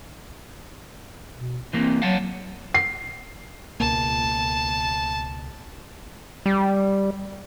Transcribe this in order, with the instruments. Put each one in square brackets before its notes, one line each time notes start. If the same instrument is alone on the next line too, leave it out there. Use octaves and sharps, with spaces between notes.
[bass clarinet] B2
[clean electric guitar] E3 A#3 [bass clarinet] C4
[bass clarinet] F#3 [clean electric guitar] F5 F#5 A5
[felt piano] C7
[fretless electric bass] C#2 B2 A#3 [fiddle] A5
[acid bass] G3